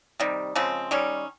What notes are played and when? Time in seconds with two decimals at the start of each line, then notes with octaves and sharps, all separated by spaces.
0.20 C3 D#3 G3
0.55 C#3 F3 G#3 C4
0.91 D#3 G3 C#4